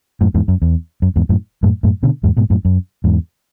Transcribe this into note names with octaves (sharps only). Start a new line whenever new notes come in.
F#2 A2
E2 G#2
F#2
E2
F#2
E2 G#2
F#2 A2
F#2 A2
F#2 A2
B2 D3
E2 G#2
G#2 B2
F#2 A2
F#2
E2 G#2